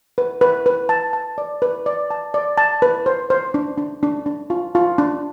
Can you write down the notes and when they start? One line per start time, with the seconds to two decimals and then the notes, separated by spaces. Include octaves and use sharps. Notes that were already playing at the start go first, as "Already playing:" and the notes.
0.18 B4
0.41 B4
0.66 B4
0.89 A5
1.13 A5
1.38 D5
1.62 B4
1.86 D5
2.11 A5
2.34 D5
2.58 A5
2.82 B4
3.06 C5
3.30 C5
3.54 D4
3.78 D4
4.03 D4
4.26 D4
4.50 F4
4.75 F4
4.98 D4